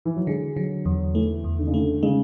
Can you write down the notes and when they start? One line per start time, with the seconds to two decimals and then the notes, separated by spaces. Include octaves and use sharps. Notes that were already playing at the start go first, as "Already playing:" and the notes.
0.05 E3
0.16 F#3
0.27 D3 G#3
0.57 D3 F#3
0.85 E2 F#3
1.15 E3 A3
1.44 E2
1.59 D3
1.67 C#3
1.74 D3 A3
2.03 C#3 G#3